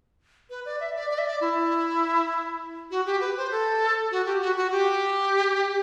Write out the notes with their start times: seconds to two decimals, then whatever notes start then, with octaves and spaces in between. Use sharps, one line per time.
0.50 B4
0.65 D5
0.80 E5
0.95 D5
1.11 D5
1.18 E5
1.25 D5
1.41 E4
2.91 F#4
3.06 G4
3.21 B4
3.37 C5
3.51 A4
4.11 F#4
4.26 G4
4.41 F#4
4.57 F#4
4.71 G4